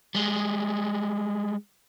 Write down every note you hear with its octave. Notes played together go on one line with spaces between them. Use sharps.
G3 G#3